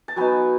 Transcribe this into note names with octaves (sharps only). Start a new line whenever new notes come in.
A5
F#3 B3 D#4 G#5